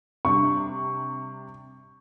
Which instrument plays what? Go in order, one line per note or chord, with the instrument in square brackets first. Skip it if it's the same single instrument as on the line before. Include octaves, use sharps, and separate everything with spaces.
[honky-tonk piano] C3 G3 D4 [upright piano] C#6